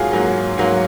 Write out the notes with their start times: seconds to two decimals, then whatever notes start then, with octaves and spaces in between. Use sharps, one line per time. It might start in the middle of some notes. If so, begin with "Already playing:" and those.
Already playing: G#2 F#3 A#3 F4 F#4 G#4
0.12 G#2 F#3 A#3
0.58 G#2 F#3 A#3